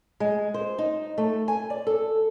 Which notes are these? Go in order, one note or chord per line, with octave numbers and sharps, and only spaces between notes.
G#3
C5
D#4
A3
G#5
D5
A4